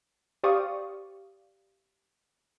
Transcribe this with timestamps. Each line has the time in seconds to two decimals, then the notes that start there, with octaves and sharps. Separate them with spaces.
0.43 G4 C5 D5 F5 C#6 D#6